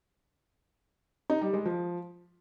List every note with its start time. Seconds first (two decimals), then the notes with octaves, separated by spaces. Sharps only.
1.30 D#4
1.42 G3
1.54 G#3
1.65 F3